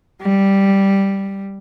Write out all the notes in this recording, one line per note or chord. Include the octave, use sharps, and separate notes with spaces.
G3